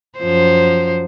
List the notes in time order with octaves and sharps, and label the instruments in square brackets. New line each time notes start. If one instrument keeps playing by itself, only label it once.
[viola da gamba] F#2 F3 C5